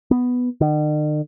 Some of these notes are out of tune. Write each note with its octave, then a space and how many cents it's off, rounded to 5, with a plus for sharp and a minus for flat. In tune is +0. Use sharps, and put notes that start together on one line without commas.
B3 +5
D#3 -45